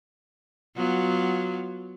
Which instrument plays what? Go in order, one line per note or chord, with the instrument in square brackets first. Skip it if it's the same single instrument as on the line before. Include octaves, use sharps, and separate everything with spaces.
[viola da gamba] F#3 B3 F4